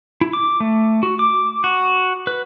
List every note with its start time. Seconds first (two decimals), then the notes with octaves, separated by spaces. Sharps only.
0.21 E4
0.33 D6
0.60 A3
1.03 F#4
1.19 D6
1.64 F#4
2.27 B4